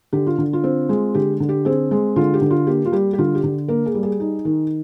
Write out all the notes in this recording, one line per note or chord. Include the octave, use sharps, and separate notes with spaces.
D3 G4
F4
D3
F4
C4
G#3
D3 G4
D3
G4
C4 G#4
G#3
D3 F4
G4
D3
F4
A#3 G4
F4
G3 G4
G4
D3 F4
G4
D3
A#3 A#4
G#4
G3
G#4
D#4
D#3